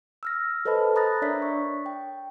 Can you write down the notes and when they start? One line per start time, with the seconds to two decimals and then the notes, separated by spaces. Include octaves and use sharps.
0.23 E6 F6 A#6
0.65 A4 B4 C5 D#5 A5 B5
0.96 A#5 B5 D#6 F#6 A6 A#6
1.22 D4 A#4 C#5 D5 E5 B6
1.42 C#6
1.86 G5